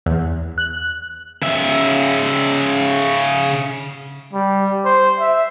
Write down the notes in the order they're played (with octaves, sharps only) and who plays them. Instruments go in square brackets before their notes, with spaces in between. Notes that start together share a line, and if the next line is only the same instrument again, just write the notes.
[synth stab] E2
F#6
[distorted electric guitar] C#3 E5
[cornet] G3
C5
E5